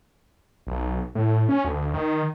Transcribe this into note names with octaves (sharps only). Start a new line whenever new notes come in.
B1
A2
C#4
D2
D#3